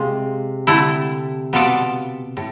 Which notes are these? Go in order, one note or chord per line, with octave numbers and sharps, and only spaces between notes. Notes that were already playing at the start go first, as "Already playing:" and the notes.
Already playing: C3 G#3 F4
D3 A3 E4
B2 B3 F4 A4 D5
A2